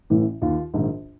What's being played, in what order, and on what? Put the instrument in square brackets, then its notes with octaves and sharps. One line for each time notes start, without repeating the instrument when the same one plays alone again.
[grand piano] A1 A2 E3
D#2 D#3 F4
A#1 G#2 D#3